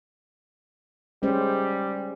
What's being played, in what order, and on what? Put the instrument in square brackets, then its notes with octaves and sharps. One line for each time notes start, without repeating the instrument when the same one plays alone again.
[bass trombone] G3 [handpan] G#3 C#4 C5